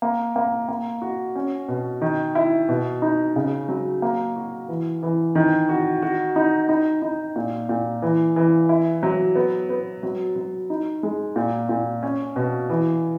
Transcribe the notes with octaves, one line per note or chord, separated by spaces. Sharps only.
A#3
A#3
A#3
F#4
C#4
B2
D#3
E4
B2
D#4
C#3
F#3
A#3
F#4
E3
E3
D#3
F#4
F#4
D#4
D#4
D#4
A#2
A#2
E3
E3
E4
F#3
B3
B3
F#3
F#3
D#4
G#3
A#2
A#2
C#4
B2
E3